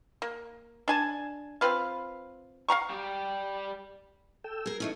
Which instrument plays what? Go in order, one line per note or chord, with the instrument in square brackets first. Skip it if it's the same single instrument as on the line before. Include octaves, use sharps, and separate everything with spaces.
[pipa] A#3
D4 G#5 A5
C4 F4 B4 F5
F5 F#5 A#5 C#6
[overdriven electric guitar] G3 G4
[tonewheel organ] A4 G5 E6
[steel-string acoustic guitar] G#4 A#4
[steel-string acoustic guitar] E3 A3 C#4 [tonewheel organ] D#4 E4